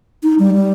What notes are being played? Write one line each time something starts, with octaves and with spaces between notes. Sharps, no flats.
D#4
G3
G3